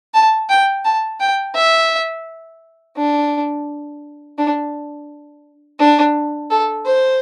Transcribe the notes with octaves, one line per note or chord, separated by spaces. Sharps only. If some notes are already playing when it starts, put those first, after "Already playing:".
A5
G5
A5
G5
E5
D4
D4
D4
A4
C5